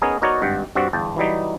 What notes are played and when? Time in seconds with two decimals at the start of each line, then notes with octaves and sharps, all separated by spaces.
0.02 B3 C#4 D#4 G#4 A#4
0.22 B3 D#4 F#4 A#4 C#5 D5
0.42 G#1 G2 F#5 G5
0.75 G2 C4 F#4 D5 F#5
0.93 G1 E2 G5 A5
1.16 E3 F#3 G3 D#4